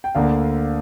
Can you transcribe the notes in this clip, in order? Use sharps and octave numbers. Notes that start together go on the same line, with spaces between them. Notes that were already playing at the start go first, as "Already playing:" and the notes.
G5
D2 D3 A#3 F5